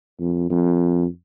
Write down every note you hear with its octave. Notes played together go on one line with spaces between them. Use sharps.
F2
F2